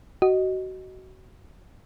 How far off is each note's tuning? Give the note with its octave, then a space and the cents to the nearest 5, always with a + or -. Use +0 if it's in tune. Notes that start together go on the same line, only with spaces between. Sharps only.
F#4 +25 D#5 +0